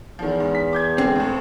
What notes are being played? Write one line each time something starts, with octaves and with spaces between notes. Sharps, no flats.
E2 D#3 F3
G#2
B6
D6 G6 G#6
D3 G#3 C4
D#2 A2